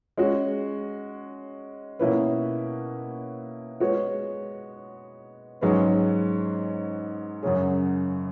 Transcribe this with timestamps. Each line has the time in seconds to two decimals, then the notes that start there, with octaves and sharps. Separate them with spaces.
0.17 G#3 C#4 F#4
1.99 B2 A#3 C#4 E4 B4
3.80 G#3 B3 F#4 C#5
5.61 G#2 F#3 C#4 G#4 B4
7.43 F#2 C#3 F#3 C#4 G#4